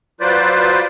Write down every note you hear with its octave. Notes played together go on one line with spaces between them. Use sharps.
F#3 F4 B4 C5 D5